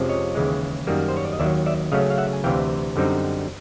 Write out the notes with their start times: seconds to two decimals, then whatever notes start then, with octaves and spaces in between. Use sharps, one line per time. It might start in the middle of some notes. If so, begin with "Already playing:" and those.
Already playing: F2 C3 F3 G#3 C#4
0.09 C#5 D#5
0.35 D#2 C#3 E3 G#3
0.87 F#2 D#3 G3 A#3
1.09 C5
1.17 C#5
1.25 D5
1.33 D#5
1.39 D#2 D#3 F#3 D5 E5
1.66 D5 E5
1.92 C#3 F#3 A3 C#4 D#5 F5
2.10 F5
2.18 E5 F#5
2.33 G#5
2.44 D2 C3 E3 F5 G5
2.96 F#2 D3 G3 C4 D#4